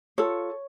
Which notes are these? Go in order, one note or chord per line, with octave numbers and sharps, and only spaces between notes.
F4 A4 C#5